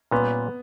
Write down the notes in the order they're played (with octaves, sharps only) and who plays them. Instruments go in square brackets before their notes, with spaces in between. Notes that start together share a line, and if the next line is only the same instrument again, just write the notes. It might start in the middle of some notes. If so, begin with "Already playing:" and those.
[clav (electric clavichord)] A#2 G3 C#4 [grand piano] B3